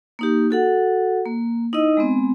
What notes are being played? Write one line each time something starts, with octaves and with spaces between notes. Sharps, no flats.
A#3 D#4 G4
F#4 A4 F#5
A#3
D#4 E4 D#5
G#3 B3 C4